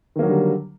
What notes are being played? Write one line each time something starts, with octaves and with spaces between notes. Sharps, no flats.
D3 D#3 F#3 G3 A#3